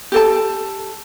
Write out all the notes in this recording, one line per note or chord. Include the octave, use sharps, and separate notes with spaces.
G4 A4 A5